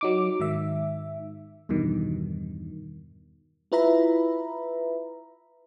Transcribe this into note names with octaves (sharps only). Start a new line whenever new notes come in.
F#3 D#4 D6
G#2 D#3 E5
E2 G2 B2 D#3
E4 F4 B4 E5 A#5 B5